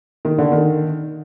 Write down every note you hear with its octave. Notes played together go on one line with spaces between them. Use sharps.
D#3
D3
D#3